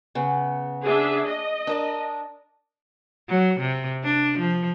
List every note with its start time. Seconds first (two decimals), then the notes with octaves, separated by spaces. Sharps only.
0.15 C#3 B3
0.85 D4 G#4 E5
1.25 D#5
1.67 D4 A#4 D5
3.29 F#3
3.60 C3
4.04 D4
4.39 F3